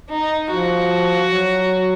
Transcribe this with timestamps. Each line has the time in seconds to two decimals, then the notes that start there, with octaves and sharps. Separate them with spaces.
0.10 D#4
0.50 F3 F#4
1.31 F#3